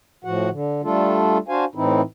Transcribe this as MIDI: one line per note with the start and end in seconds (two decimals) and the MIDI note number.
0.25 0.49 45
0.25 0.49 53
0.25 0.49 66
0.25 0.49 78
0.50 0.81 50
0.84 1.38 55
0.84 1.38 57
0.84 1.38 62
0.84 1.38 65
0.84 1.38 69
1.48 1.65 62
1.48 1.65 66
1.48 1.65 72
1.48 1.65 77
1.48 1.65 80
1.75 2.02 45
1.75 2.02 52
1.75 2.02 60
1.75 2.02 63
1.75 2.02 64